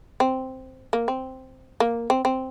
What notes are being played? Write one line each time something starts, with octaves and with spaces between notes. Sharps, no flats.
C4
A#3
C4
A#3
C4
C4